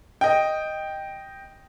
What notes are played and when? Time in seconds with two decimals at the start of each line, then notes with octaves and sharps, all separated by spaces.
0.21 D#5 G5